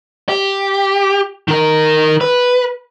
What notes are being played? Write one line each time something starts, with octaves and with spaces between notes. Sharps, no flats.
G4
D#3 A#4
B4